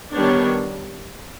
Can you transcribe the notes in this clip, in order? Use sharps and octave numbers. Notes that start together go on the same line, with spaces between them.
D#3 G3 B3 D4 C#5